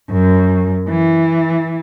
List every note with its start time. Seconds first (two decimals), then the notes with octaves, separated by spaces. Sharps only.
0.10 F#2
0.88 E3